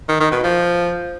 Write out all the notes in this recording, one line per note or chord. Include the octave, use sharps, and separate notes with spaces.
D#3
D#3
B2
F3